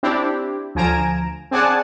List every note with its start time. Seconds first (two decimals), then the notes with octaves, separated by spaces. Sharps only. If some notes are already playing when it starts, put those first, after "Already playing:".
0.03 C4 D4 E4 G4
0.75 D2 F3 G#5 A#5 D7 E7
1.51 C4 G#4 D5 F#5 G#5 A5